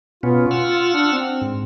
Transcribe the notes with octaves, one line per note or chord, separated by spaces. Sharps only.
B2 B3 C#4 F4
F#5 E6 F6
D4
C4
G#2